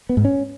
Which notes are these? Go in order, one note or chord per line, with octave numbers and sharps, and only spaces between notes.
B3
G#2
C#4